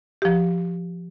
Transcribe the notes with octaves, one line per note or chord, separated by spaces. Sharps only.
F3 G4